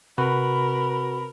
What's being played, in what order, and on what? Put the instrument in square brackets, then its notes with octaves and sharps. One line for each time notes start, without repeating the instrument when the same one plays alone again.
[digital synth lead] C3 [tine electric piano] F#4 B4 [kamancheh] A#4 [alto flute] B5